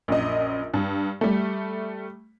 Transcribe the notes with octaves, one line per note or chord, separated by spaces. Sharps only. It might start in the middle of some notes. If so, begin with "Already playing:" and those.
A#1 F#2 D#5
G2
G3 A3